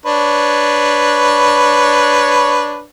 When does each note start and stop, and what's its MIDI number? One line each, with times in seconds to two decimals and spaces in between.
0.06 2.84 62
0.06 2.84 71
0.06 2.84 73